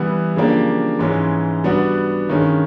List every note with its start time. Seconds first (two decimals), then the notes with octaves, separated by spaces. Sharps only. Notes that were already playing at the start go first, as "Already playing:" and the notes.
Already playing: E3 G3 B3
0.36 C#3 F3 A#3 D4 G4
0.99 G#2 E3 G#3 C#4
1.64 G3 B3 D4 F#4
2.29 G2 D#3 G#3 C#4